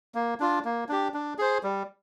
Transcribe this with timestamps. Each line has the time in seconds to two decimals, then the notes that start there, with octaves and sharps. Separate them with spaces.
0.15 A#3
0.40 D4 F4
0.65 A#3
0.89 D4 G4
1.14 D4
1.38 G#4 C5
1.63 G3